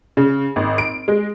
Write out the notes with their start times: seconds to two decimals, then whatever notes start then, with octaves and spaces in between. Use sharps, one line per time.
0.17 C#3
0.56 G#1
0.78 D7
1.08 G#3